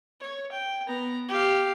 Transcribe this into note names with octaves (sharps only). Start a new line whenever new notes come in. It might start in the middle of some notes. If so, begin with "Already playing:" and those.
C#5
G5
B3 A#5
G4 F5